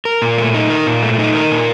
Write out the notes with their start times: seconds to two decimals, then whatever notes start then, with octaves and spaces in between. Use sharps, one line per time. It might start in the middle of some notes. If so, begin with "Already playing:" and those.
0.05 A#4
0.22 A#2
0.38 A3
0.54 D#4
0.70 A#4
0.87 A#2
1.03 A3
1.18 D#4
1.35 A#4
1.51 A#2